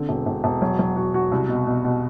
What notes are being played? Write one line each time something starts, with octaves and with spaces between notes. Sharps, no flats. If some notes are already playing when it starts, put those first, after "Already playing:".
Already playing: D3 C4
E1
E1
E1
F#3
F#3
F#4
F#4
C2
B2
B2
B2